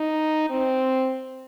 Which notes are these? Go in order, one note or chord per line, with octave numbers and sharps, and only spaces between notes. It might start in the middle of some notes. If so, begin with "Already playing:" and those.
Already playing: D#4
C4